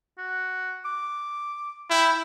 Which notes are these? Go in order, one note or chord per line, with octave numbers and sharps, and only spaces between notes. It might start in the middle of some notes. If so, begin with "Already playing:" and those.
F#4
D6
E4 G5